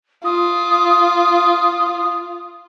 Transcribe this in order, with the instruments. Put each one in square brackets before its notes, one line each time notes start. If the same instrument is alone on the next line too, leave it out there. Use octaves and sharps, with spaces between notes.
[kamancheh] F4 [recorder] D#6